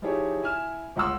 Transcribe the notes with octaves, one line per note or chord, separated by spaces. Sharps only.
F3 D#4 E4 G4 G#4 C#5
E4 G#5 F6 E7
G1 C#2 F#5 C6 E6